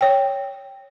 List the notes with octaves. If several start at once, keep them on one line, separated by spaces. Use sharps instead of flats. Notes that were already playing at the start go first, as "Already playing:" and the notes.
C#5 G5